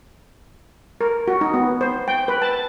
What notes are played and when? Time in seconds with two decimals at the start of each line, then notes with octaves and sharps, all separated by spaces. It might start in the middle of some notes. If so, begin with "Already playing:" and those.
1.01 A#4
1.28 F#4
1.41 D#4
1.54 B3
1.81 C5
2.08 G5
2.28 B4
2.42 A5